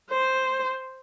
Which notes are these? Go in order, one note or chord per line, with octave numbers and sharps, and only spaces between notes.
C5